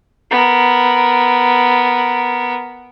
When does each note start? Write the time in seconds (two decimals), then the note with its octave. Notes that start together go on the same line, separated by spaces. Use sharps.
0.31 B3 A#4